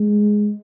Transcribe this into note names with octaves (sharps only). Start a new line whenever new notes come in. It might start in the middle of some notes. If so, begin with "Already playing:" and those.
Already playing: G#3